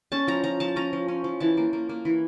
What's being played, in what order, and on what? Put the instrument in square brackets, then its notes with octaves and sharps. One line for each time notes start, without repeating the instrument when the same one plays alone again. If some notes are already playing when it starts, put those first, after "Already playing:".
[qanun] C#4 A5
F3 A#5
F3 A#5
F3 A5
C#4 A#5
F3
C#4
F3
E3 A5
A#3
A#3
A#3
E3